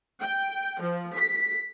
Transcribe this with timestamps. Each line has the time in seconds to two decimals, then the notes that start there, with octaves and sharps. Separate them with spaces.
0.21 G5
0.81 F3
1.15 B6